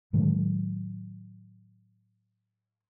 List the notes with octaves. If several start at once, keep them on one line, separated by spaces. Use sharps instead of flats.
A2 D#3 F#3 G#3